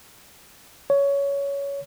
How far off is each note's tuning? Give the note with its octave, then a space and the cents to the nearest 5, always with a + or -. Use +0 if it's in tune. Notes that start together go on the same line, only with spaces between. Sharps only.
C#5 +15